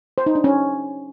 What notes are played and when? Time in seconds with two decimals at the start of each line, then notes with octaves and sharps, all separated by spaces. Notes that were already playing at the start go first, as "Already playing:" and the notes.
0.18 C5
0.26 D#4
0.35 D4
0.44 C#4